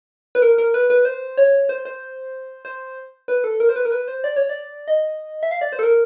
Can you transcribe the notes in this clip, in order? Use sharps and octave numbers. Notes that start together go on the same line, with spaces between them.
B4
A#4
A#4
B4
B4
C5
C#5
C5
C5
C5
B4
A4
A#4
C5
B4
A#4
B4
C5
D5
C#5
D5
D#5
E5
F5
D5
C5
A4
A#4